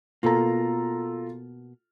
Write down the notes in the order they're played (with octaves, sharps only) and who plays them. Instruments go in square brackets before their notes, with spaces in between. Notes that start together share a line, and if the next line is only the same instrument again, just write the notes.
[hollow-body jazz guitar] B2 A#3 [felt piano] F4 A4 A#5